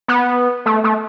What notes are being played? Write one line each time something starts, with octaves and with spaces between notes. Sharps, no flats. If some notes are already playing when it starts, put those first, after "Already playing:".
B3
A3
A3